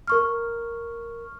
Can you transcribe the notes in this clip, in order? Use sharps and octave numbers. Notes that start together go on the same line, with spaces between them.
A#4 C#6 F6